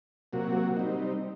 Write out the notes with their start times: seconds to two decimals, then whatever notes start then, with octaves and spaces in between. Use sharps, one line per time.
0.33 C3 F#3 A#3 F#4
0.77 G3 C4 D#4